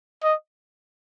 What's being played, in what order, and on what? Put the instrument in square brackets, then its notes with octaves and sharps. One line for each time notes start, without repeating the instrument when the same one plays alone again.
[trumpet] D#5